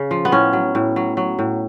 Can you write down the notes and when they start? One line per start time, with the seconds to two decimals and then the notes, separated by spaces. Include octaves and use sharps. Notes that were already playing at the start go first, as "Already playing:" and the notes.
Already playing: C#3
0.11 F3
0.25 B3
0.32 A2 C#4
0.53 F#3
0.75 A2
0.96 F#3
1.17 F#3
1.39 A2